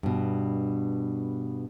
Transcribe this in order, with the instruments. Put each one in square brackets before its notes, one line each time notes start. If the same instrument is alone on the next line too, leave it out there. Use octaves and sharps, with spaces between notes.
[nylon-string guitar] G2 B2